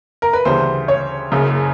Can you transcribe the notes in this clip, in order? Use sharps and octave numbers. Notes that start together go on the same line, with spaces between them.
A#4
B4
D2 C#3 E3 G3 C5
C#5
F#1 F#2 C#3